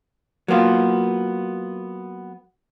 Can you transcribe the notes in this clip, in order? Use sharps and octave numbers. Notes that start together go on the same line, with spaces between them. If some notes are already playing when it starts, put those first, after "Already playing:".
F#3 A#3 B3 F4